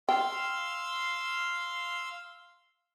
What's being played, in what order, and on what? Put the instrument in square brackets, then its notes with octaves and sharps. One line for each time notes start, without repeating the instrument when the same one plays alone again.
[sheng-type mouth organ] F5 C6 E6 [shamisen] G5